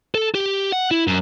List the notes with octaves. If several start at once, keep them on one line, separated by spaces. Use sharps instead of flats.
A4
G4
F#5
E4
F#2